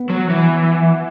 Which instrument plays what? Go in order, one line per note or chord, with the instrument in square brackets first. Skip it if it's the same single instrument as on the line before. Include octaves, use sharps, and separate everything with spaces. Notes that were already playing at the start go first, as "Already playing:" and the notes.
Already playing: [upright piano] B3
[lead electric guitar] F#3
E3